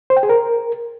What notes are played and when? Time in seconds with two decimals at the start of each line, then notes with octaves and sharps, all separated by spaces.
0.10 C5
0.17 G5
0.23 G#4
0.29 A#4